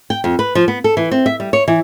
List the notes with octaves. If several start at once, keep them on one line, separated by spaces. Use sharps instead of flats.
G5
F2
B4
F3
B3
A4
E3
C4
E5
G3
C#5
E3